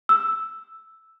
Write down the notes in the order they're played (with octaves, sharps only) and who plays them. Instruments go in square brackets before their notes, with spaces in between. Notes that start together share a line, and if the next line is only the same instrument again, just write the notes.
[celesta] E6